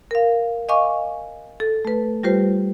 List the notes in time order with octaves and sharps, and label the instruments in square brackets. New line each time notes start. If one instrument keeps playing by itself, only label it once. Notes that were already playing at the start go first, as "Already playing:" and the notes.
[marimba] A#4 F5
D#5 F5 G#5 C#6 D6
A4
A3 B4
G3 F4 G4 B4 C5